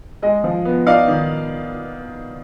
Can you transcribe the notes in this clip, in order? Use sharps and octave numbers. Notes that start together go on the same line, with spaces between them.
G#3 D#5
F3
B3
D#4 D5 F5
D#3